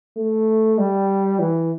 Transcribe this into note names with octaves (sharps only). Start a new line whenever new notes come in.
A3
G3
E3